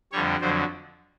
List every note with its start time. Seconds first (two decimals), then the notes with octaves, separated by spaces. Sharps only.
0.12 F2 D3 G3 C#5
0.41 F2 D3 F#3 C5